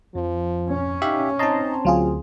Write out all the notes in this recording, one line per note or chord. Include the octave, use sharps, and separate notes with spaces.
F2 F3
C#4
D#4 G4 E5 F5
C4 D#4 D#5 A5 A#5 C6
D2 F#3 F4 G#4